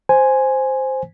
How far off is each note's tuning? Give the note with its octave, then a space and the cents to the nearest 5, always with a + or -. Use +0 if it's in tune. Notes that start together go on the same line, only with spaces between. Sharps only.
C5 +0 G#5 +0